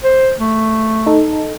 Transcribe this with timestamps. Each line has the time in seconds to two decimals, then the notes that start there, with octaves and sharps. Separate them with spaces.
0.04 C5
0.40 A3
1.06 D#4 A4